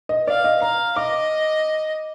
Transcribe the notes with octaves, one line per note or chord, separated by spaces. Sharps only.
D#5
D5 F5
D#5
F5 A#5
D#5 D6